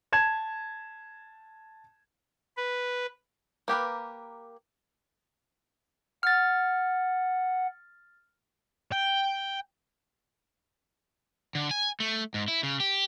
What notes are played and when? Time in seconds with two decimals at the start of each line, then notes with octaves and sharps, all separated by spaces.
0.12 A5 G#6 E7
2.57 B4
3.68 A#3 G4 A#4 B4
6.23 F#5 F6 A6
8.92 G5
11.55 D3
11.71 G#5
12.00 A3
12.34 G#2
12.48 E4
12.63 C#3
12.80 G4